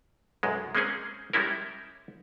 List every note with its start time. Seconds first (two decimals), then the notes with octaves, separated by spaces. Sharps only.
0.43 B1 F#2 G#3
0.75 G#3 A#3 C4 C#4 G#4
1.33 G3 G#3 C#4 E4 A#4